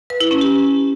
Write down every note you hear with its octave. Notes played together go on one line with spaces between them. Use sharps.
B4
E4
C#4
G4